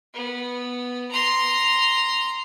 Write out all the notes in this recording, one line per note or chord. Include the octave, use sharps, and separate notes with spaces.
B3
A#5 C6